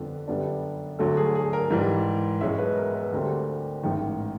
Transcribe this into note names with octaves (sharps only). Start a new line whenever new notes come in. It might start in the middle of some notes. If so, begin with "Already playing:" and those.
Already playing: F2 D3 G3 B3 D4
F#2 D3 G3 B3 D4
D2 D3 F#3 A4
G#4
G#4
A#4
G#2 E3 G3
B1 B2 G#3 C#4 E5
B4
A#4
B4
D2 D3 G3 C4 A#4
A1 G#2 D#3